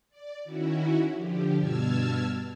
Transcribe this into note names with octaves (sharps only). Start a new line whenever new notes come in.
D5
D#3 C#4 E4 F#4
D3 F3 G4
G2 B2 A5 E6 F6 G#6